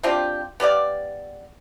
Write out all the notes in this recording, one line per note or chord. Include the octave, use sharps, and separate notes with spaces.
C4 D4 F4 G4
B3 G4 D5 F5